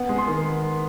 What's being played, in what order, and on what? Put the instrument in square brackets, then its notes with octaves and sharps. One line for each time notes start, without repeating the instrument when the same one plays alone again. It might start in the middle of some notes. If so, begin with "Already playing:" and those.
Already playing: [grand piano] B3 F#5
G#3
C6
D#3